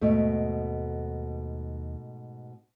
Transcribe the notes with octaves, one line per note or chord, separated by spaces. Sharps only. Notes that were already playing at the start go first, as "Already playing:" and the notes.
D#2 G#2 B2 A3